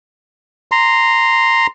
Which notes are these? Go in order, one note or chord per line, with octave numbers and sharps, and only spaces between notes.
A#5 C6